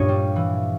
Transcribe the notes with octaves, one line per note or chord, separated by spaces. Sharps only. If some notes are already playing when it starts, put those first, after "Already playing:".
Already playing: G2 A#2 D4 C#5 D#5 F5
G3
E3